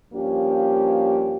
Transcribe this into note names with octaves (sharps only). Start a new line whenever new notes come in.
G2 F3 A#3 C#4 G4